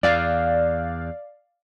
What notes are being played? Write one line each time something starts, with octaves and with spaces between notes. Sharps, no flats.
E2 D5 F5